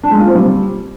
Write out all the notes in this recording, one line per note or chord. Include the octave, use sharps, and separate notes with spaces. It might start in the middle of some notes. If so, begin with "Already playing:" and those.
D4
G#3
F4
C4
G3